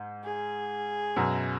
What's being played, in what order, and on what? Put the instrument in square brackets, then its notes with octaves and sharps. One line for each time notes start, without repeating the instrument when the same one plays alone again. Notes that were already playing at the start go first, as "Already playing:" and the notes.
Already playing: [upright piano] G#2
[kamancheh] G#4
[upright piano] F#2 B2